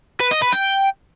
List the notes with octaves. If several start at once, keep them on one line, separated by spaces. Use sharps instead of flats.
B4
D#5
B4
G5